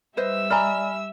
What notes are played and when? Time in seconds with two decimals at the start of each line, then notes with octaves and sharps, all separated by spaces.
0.17 G3 B4 C5 D#5 E5 E6
0.50 D5 D#5 G#5 A#5 B5 F6